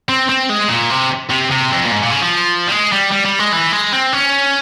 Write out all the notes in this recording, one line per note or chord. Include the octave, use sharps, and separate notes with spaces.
C4
C4
G#3
A#2
C3
C3
C3
F2
A#2
G#2
A#2
C#3
F3
G3
G#3
G3
G3
G3
G#3
E3
G#3
C4
C#4